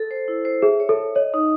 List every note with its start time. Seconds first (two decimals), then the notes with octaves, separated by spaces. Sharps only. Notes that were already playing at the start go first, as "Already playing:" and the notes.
Already playing: A4
0.11 C5
0.28 E4
0.45 C5
0.62 G#4 E5
0.80 C#5
0.89 A4
0.98 E5
1.15 C#5 D#5
1.34 D#4